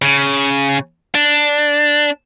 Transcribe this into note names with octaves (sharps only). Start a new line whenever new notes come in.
C#3
D4